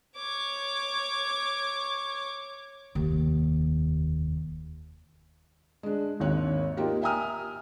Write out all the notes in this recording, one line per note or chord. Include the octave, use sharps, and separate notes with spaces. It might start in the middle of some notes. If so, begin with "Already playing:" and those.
C#5 D6
F1 D#2
G#3 D4
G#1 D#2 C#5 F#6
A#3 D#4 F4 G4 A#4
E5 G5 G#5 A#5 D#6 F6